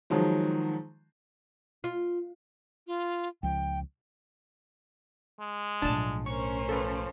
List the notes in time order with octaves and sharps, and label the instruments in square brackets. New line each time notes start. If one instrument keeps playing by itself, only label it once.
[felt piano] D#3 F3 F#3 G#3
[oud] F4
[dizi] F4
[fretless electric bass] C#2 F3 [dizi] G5
[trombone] G#3
[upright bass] B1 A2 [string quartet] F3 [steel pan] D4 A5
[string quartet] C#4 A#4 C5 [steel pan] C#6
[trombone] F3 [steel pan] A4 B4